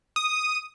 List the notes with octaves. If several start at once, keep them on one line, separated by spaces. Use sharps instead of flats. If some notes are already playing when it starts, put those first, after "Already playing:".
D#6